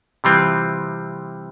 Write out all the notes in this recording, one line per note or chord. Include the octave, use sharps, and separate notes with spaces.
C3 E3 G3 C4 F4